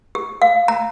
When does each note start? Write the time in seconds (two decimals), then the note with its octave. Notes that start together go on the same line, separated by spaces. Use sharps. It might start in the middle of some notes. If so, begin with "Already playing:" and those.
0.15 G4
0.42 F5
0.68 A#5